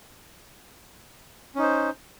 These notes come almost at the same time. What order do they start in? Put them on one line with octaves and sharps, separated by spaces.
C#4 D#4 C5